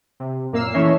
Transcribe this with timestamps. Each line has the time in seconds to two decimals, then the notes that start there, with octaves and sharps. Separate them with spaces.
0.20 C3
0.52 F#2 A#2 A#3 F5 E6 C7
0.74 E3 A3 C#4 C#5 D#5 E5